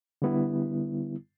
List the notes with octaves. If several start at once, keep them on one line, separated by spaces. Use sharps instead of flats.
D3 G3 B3 E4